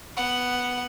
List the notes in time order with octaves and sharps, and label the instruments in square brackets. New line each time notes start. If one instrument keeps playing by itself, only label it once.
[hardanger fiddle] B3 F#5